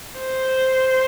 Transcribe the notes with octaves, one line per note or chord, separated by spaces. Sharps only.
C5